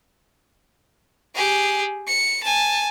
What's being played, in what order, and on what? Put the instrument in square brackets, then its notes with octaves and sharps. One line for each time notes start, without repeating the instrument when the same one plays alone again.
[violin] G4 G#4
C#7
G#5 A5